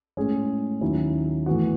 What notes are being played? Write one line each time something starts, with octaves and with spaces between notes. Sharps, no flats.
A2 G#3 C#4 G#4
D#2 D#3 F#3 C#4 E4
A2 E3 B3 F#4